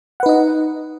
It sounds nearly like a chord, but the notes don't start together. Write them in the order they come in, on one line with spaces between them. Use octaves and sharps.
F#5 B4 D#4 D#5